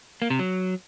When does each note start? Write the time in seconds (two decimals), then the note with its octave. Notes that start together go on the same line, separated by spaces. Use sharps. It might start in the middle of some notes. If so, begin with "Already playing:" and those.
0.22 A#3
0.30 C3
0.39 F#3